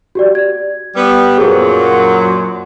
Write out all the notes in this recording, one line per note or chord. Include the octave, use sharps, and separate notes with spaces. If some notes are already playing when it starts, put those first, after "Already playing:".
F#4 G4 D5
G#6
G3 B3
F#2 A#2 F#3 G#4 C5
C6